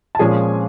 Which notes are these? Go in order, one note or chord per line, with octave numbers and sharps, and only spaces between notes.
A5
A#2 F3 G#3 C#4 G#4 G#5